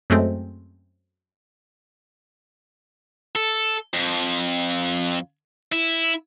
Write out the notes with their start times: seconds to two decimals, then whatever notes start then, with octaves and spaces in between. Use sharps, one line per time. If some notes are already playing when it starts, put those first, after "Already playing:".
0.10 F#2 G#3 A3 C4
3.36 A4
3.93 F2
5.72 E4